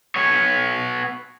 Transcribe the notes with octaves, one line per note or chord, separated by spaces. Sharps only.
B3 C#5